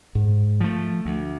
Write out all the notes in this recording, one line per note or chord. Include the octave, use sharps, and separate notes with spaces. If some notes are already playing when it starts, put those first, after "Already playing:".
G#2
F3 A3
D2